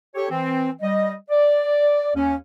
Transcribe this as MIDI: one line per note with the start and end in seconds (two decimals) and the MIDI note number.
0.15 0.27 67
0.15 0.27 69
0.15 0.27 73
0.30 0.70 52
0.30 0.70 60
0.82 1.13 55
0.82 1.13 75
1.30 2.11 74
2.14 2.35 39
2.14 2.35 61